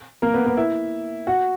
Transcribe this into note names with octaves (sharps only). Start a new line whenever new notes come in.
A#3 A#4
B3 B4
B3 B4
E4 E5
F#4 F#5